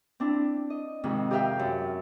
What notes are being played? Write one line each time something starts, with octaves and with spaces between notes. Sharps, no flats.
C4 D4 E4
D#5
F2 G#2 C3 D#3
G4 G#4 A#4 E5 F5 G5
F#2